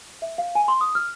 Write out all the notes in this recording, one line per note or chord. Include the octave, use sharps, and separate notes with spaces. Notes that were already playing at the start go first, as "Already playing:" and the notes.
E5
F5
G#5
C6
D#6
F6